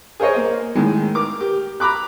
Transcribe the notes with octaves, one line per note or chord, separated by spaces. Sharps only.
G#4 A#4 C5 C#5 D#5
A#3
A2 D#3 G#3
A#4 D6
G4
A#5 B5 D6 F#6